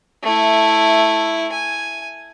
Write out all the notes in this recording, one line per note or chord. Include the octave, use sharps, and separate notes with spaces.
A3 E4
G#5